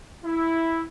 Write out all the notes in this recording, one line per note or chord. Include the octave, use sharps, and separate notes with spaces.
E4